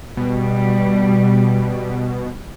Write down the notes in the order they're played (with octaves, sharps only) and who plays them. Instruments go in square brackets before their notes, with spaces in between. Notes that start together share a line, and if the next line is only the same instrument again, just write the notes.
[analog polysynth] B2 [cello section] G3